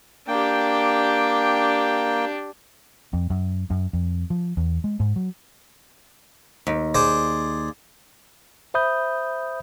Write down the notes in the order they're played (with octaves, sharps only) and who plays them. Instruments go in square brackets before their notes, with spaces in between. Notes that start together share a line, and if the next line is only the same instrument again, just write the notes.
[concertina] A#3 G5 [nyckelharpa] D4 G4
[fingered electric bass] F2
F#2
F#2
F2
F3
E2
G#3
G#2
F#3
[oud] D#2
[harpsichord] G#4 C5 D5
[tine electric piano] C5 E5 B5 D#6 G6